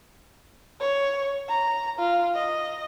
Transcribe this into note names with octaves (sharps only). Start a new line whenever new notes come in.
C#5
A#5
F4
D#5